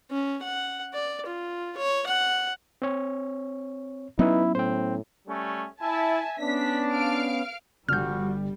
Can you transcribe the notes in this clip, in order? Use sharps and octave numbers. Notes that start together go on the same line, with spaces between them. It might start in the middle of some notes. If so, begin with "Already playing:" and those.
C#4
F#5
D5
F4
C#5
F#5
C4 C#5
F#3 B3 C#4 D#4 E4 B4
A2 C5 G5
G3 A3 C#4
E4 E5 G#5 A5
B3 C#4 D4 B6
F5 F6 D7
G1 F3 G3 D4 F#4 F6 G6